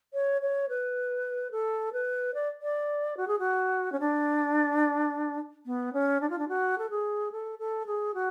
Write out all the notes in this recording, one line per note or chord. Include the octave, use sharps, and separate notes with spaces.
C#5
C#5
B4
A4
B4
D5
D5
F#4
G#4
F#4
C#4
D4
B3
C#4
D4
F4
D4
F#4
A4
G#4
A4
A4
G#4
F#4